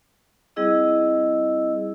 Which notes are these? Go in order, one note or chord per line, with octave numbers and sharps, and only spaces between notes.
G3 C4 E4 G#4 D#5 E6